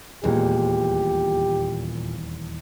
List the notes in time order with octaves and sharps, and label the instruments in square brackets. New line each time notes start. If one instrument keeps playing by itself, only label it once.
[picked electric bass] D#1 E2 [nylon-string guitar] A#2 G#3 [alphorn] G4